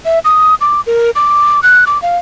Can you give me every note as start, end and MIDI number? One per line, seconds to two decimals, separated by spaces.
0.05 0.19 76
0.25 0.55 87
0.61 0.81 86
0.87 1.11 70
1.15 1.60 86
1.63 1.85 90
1.87 2.01 86
2.02 2.17 77